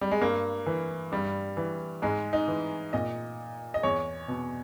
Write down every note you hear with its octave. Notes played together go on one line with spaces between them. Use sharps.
G3
G#3
G2 A#3
E3
G2 G3
E3
G#2 G#3
D#4
E3
A#2 D#5
D#5
E2 C#5
B2